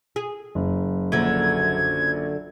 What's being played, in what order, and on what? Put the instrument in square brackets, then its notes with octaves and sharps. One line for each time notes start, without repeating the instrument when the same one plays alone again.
[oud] G#4
[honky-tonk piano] F#1
[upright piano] A#1 [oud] F#2 D3 [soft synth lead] G#6